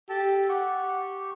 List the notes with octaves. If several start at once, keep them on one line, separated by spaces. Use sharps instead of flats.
G4 A4 A5
G4 F#5 C#6